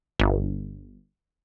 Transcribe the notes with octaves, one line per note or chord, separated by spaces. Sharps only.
G1